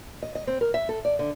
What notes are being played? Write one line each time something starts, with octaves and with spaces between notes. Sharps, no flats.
D#5
D#5
C4
A#4
E5
A4
D5
D3